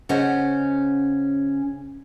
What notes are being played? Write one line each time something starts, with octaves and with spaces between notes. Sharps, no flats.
C#3 C#4 C5 D#5 F#5